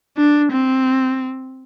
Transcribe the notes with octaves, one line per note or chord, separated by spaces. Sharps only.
D4
C4